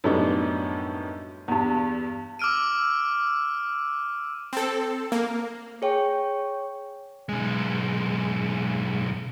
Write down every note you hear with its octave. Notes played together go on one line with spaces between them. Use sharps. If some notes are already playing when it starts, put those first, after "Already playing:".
F#2 A2 G3 B3 D4 D#4
E2 G2
D6 E6 F6 D7 D#7
C4 A4
A#3
G#4 C#5 G5 C#6
B1 G#3